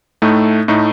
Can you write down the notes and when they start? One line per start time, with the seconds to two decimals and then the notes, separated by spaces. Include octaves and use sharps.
0.22 A2 A3 D#4
0.68 A2 A3 D#4